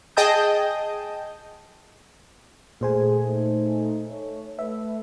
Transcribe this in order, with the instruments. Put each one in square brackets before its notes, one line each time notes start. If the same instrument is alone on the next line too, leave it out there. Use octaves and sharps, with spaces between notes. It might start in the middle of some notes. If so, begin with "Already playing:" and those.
[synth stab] G#4 D#5 G5 A5 D#6 G6
[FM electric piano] A#2 C5 G#5 [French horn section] A3 G#4
[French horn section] A3 D#4
A3 C#5
[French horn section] A3 B4 [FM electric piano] E5